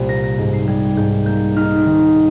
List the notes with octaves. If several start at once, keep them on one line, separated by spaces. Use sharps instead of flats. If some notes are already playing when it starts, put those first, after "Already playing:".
Already playing: C2 A#2 G3
A#3 A#6
A#6
G#2
C7
G3 G#6
G#2 G6
A#3 G6
D#4 F6
D#3